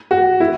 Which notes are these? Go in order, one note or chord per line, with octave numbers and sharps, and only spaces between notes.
F#4
E4